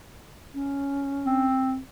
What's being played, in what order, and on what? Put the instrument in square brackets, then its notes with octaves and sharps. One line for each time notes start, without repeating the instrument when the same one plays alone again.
[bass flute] C#4
[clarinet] C4